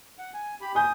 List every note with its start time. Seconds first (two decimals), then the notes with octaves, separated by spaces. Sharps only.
0.18 F#5
0.34 G#5
0.61 G4 B5
0.75 G#5 D#6 G6